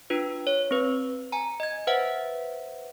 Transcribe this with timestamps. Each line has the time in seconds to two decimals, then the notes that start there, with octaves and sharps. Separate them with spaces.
0.10 D4 F4 B4
0.47 C#5
0.71 C4 B4
1.32 G#5 A#5
1.60 D#5 G#6
1.87 B4 C5 E5 F#5